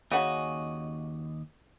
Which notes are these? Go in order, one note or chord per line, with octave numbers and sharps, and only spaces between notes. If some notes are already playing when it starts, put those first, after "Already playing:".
D#2 C#3 C#4 F#4 D#5